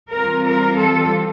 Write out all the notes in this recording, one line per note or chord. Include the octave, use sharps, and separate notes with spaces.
E3 G3 C4 F4 A#4
A#4
A4